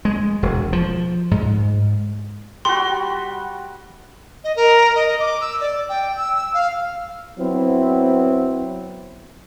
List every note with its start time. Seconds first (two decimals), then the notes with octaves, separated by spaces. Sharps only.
0.05 G#3
0.43 E1
0.73 F3
1.31 G#2
2.65 G3 F#4 C6
4.44 D#5
4.56 A#4
4.95 D#5
5.20 D6
5.41 E6
5.61 D5
5.89 G5
6.16 E6
6.35 E6
6.54 F5
7.38 F#3 B3 C4 E4